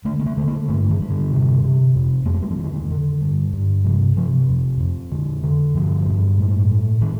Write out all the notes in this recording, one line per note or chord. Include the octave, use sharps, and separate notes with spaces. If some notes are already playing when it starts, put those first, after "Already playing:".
D3 A3
A#3
A3
D3 A3
A#3
G2 A3
D#3
G2
D3
C3
C3
F2
F2 A#3
A3
G3
F3
D3 D#3
D3
G2
G2
C3 F3
C3 F3
F2
F2
D3
D3
G2 F3
G2
A2
A2
A2 D#3